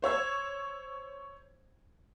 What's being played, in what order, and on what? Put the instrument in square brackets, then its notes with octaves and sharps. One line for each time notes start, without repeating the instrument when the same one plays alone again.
[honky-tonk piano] C5 C#5 E6 G#6